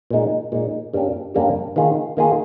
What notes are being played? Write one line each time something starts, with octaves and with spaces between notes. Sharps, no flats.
A#2 G#3 D#4
A#2 G#3 D#4
G2 G3 A#3 C#4 G4
G2 G3 A#3 C#4 G4
D#3 A#3 F4 G#4
D#3 A#3 F4 G#4